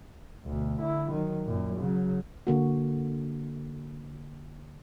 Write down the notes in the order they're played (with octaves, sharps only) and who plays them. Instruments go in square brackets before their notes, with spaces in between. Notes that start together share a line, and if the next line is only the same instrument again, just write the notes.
[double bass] D2 B2
D3 E4
D#3 F#3
F#2 A#2
C#3 F#3
[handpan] D3 A#3 F#4